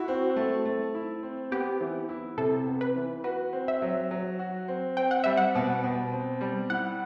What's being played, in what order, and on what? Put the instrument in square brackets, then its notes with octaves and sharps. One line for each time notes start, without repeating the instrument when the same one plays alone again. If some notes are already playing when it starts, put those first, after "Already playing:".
Already playing: [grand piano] E4 [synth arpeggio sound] F#4
[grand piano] C4
A3
A3
E4
C4
[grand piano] B3 [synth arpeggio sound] G4
[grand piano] E3
E4
[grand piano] C3 [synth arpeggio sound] A4
[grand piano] B3
[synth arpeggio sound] B4
[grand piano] E3
[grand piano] F#4 [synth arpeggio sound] B4
[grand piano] C4
[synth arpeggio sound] E5
[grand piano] F#3
F#3
F#4
C4
[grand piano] C4 [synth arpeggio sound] G5
[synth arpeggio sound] F#5
[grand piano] G3 [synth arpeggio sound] E5
[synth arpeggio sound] F#5
[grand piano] B2
B2
C4
G3
[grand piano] E4 [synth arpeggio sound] F#5